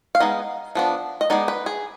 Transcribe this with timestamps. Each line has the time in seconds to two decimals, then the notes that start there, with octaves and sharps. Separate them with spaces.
0.15 F5
0.20 G#3 B3 D#4 D#5
0.75 F3 B3 D4
1.21 D#5
1.30 G#3 B3 D#4 D5
1.48 B4
1.66 G#4